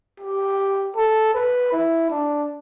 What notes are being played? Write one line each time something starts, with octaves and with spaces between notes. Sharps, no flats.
G4
A4
B4
E4
D4